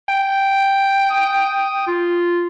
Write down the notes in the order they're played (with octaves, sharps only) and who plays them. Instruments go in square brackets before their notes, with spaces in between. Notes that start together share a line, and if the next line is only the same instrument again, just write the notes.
[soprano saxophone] G5
[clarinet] D#6
F4